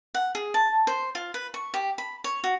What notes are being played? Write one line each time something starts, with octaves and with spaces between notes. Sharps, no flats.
F#5
G#4
A5
C5
F4
B4
C#6
G4
B5
C#5
F#4